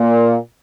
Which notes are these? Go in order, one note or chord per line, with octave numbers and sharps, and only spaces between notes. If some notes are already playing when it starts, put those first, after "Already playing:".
Already playing: A#2